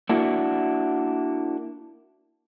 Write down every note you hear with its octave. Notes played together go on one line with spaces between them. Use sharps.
A#3 D4 E4 F#4